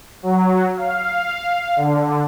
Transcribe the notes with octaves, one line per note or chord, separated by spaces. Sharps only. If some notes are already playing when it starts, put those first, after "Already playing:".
F#3
F5
D3